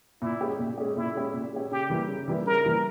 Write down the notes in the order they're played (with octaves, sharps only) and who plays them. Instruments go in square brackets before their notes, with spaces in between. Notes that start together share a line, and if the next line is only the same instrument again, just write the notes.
[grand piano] A#2 [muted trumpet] E4
[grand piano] G#3 C#4 G4
A#2
G#3 C#4 G4
[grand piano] A#2 [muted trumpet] E4
[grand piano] G#3 C#4 G4
A#2
G#3 C#4 G4
[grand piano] C#3 [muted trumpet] G4
[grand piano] E3 G3 A#3 E4
C#3
E3 G3 A#3 E4
[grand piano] C#3 [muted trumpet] A#4
[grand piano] E3 G3 A#3 E4